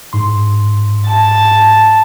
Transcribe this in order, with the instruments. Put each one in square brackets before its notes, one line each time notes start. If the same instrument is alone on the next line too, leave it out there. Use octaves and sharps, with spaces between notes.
[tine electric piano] G#2 C6
[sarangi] A5